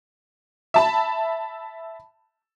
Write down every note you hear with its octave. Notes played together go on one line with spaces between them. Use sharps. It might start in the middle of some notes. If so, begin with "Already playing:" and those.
E5 A5 B5